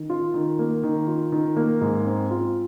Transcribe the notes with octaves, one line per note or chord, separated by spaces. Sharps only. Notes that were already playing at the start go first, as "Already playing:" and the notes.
Already playing: D#3
F4
D#3
A#3
D#3
F4
D#3
A#3
G#2
C4
F4